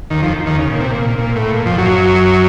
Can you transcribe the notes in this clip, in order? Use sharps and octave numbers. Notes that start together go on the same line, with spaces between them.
D#2 D#3
F2 F3
D#2 D#3
C#3
A#2
C3
A#2
A#2
A2
A#2
F2 F3
F#2 F#3